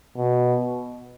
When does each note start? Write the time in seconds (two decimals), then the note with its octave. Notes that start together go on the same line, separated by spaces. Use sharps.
0.17 B2